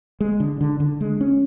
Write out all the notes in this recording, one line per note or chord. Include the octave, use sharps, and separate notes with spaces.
G#3
D3
D3
D3
G#3
C#4